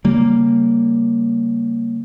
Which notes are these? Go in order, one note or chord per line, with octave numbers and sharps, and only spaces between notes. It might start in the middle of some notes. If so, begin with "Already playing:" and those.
C#3 G3 A#3